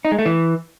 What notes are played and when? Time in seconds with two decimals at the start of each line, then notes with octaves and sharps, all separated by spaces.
0.05 D#4
0.12 G#3
0.19 A3
0.26 E3